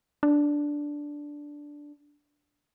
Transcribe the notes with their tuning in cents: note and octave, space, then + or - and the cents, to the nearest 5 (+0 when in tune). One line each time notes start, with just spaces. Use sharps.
D4 -5